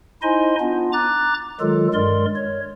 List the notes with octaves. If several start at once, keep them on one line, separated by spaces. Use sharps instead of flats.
D#4 E4 C5 D#5 G#5 C6
B3 D4 F4
A#5 D6 F#6 A6
D#3 F#3 G#3 F4 A4
G2 G#3 A#4 D5 C6
C#5